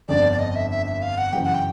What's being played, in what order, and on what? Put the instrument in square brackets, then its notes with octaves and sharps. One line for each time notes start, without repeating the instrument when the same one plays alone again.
[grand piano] G1 F2 D3 [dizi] D5
[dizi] D5
D#5
E5
E5
E5
F5
F#5
[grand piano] F#2 C#3 E3 [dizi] G5
[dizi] F#5
G5